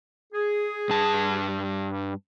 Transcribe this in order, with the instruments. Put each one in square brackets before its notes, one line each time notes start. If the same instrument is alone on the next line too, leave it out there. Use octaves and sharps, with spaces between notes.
[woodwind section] G#4
[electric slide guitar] G2 A5